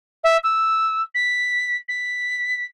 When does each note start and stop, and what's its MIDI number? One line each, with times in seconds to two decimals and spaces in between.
0.24 0.37 76
0.43 1.02 88
1.15 1.77 95
1.89 2.66 95